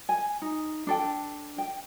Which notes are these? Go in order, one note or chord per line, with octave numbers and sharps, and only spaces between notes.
G#5
D#4
D4 A4 G5
G5